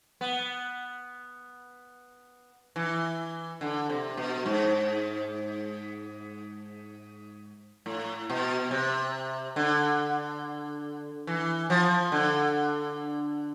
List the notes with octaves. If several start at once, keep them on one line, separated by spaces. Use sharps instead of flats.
B3
E3
D3
C3
B2
G#2
A2
B2
C3
D3
E3
F3
D3